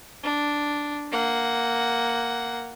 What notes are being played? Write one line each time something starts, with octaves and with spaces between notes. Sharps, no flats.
D4
A#3 F#5